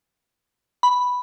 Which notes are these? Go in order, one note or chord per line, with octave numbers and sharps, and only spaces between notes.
B5